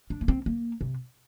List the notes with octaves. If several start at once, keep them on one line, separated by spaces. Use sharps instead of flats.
D4
A#3
C4
A#3
C3